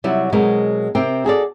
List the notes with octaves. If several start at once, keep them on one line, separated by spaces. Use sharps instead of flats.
C3 F#3 G3 E4 F#4
B2 F#3 G#3 C4 A#4
C3 C4 A#4 G5
F#4 G#4 A4 D5